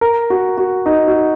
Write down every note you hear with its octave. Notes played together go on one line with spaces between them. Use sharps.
A#4
F#4
F#4
D#4
F#4